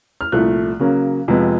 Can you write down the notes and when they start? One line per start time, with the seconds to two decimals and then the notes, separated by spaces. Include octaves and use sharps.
0.21 F6
0.32 C2 A#2 F3 A3 F#6
0.80 C#3 F#3 A#3 C#4
1.28 F2 C3 F3 G#3 B3